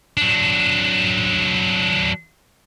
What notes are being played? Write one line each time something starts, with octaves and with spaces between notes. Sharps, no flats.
F#3 D4